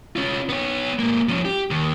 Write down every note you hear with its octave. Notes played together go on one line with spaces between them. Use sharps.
C#4 F4
B3 C#5
G#2 A#3
F3 C#4
G4
D#2